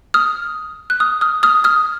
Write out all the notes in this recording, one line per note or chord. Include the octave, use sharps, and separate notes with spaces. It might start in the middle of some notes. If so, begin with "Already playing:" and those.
D#6 F6
F#6
D#6 F6
D#6 F6
D#6 F6
D#6 F6